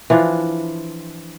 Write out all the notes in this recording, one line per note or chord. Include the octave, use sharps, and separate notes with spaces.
E3 F3 D4 F4